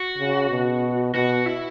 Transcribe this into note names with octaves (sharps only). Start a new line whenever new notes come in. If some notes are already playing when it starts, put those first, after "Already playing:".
Already playing: F#4
C#3
B2
B2 F#4
E4